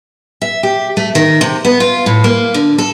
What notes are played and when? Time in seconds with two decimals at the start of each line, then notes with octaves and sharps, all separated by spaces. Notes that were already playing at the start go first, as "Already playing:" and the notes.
0.42 E5
0.63 G4
0.97 A3
1.15 D#3
1.41 C3
1.65 B3
1.80 F4
2.06 A2
2.24 A#3
2.54 D3
2.78 A4